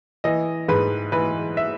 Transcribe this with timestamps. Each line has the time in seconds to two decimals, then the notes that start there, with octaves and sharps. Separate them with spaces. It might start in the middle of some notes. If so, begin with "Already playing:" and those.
0.24 E3 D#5
0.69 G#2 B4
1.12 E3 B4
1.57 E5